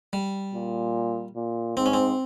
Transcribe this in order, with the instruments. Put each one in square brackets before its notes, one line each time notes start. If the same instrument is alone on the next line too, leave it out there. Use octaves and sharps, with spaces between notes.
[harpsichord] G3
[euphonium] A#2
A#2
[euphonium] G#2 [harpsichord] C4
[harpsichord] C#4
C4